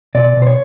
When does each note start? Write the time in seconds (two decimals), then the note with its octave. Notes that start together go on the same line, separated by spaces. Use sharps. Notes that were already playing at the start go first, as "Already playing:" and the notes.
0.15 B2 D5
0.36 B2
0.42 C5
0.47 C#5